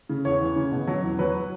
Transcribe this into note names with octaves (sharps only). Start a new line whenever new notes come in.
C#3
E2 C#5
E3
C#3
B2
F#3
E2
F#3 B4